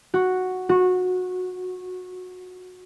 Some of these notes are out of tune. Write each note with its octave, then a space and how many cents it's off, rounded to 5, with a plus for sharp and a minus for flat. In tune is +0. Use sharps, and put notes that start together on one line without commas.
F#4 +0
F#4 -20